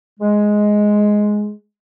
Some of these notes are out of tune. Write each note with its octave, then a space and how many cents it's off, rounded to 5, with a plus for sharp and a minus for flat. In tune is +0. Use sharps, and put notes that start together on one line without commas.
G#3 +5